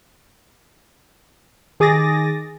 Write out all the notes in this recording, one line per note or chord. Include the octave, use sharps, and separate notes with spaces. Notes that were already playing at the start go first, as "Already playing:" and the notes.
D#3 G#4 D6 D#6 A6 A#6